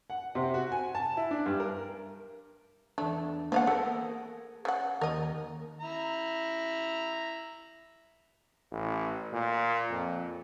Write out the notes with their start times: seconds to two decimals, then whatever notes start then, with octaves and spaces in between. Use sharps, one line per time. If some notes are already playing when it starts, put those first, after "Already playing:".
0.10 F#5
0.35 C3
0.54 F#4
0.72 G#5
0.95 A5
1.17 E4
1.31 D4
1.46 G2
1.60 A#4
2.98 E2 A3 D4
3.52 F3 A#3 B3 F5 F#5
3.67 A3 G#4 A#4
4.65 C#3 F#5
5.01 D#2 A#4 D#5
5.81 E4 A#5
8.71 A1
9.33 A#2
9.90 F2